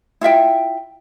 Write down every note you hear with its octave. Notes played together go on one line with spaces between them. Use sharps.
E4 F4 E5 G5